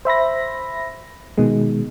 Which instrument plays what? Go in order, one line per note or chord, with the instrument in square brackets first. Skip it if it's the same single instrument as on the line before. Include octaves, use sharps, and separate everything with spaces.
[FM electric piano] C5 E5 B5 A#6
B2 D#3 G#3